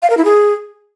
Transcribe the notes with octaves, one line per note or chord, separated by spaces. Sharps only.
F5
A#4
E4
G#4